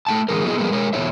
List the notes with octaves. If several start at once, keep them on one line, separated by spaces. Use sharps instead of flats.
A3 G5 A5
D3 E3 G#3 A#4
F#3 A3 B3 E4 G#4 D#5
F3 G3 G#3 A#3 B3
G#3 A#4 C#5
E2 B2 G3 D#4 C#5 E5